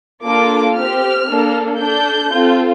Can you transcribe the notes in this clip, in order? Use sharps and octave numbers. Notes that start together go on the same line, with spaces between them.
A#3 D4 F4 A4 D6
C4 G4 F6
A#3 D4 A4
D4 A4 G6
C4 F4 A4